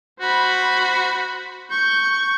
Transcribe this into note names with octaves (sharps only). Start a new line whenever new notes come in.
F#4 C5 B5
C#6 G6